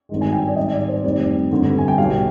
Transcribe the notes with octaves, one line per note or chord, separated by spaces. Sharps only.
G#1 G2 D#3 G#3
G#5
G5
D5
G#1 G#2 D#3 G3 D#5
D5
C5
F1 F2 D#3 G3 D5
G1 F2 D3 G3
G#5
G5
B1 B2 G3 F5